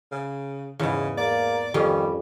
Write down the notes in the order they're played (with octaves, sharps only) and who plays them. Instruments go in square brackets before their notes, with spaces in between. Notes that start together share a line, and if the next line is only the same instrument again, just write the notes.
[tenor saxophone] C#3
[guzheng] E2 G#2 [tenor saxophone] C#3
[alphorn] A#3 [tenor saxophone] D5
[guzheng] F2 C#4 [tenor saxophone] D#3 [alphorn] G3